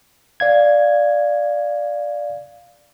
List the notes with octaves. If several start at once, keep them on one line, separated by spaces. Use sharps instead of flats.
D5 F5 G#6